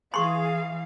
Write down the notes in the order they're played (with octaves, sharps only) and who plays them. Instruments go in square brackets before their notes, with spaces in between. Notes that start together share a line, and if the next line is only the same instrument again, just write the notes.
[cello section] E3 [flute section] G#4 [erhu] F5 [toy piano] C6 C#6